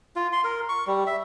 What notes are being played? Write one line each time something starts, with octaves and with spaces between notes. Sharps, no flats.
F4
C6
A#4
C#6
G3
E5